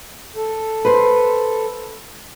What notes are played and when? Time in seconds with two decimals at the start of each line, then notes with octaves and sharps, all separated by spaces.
0.36 A4
0.85 B4 C5